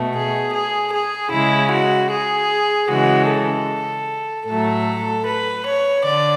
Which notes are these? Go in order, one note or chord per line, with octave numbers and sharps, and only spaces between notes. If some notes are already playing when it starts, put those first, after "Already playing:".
Already playing: B2 A3
G#4
G#4
G#4
C#3 G#3 E4
F#4
G#4
C#3 E3 G#3 F#4
A4
A2 F#3 A3 A4
B4
C#5
D3 D5